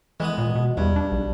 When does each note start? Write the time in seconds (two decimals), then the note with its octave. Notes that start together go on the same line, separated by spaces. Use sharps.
0.20 E3 G#3 B3 D#6
0.38 A#2
0.55 B2
0.77 E2 G2
0.96 D4
1.12 B1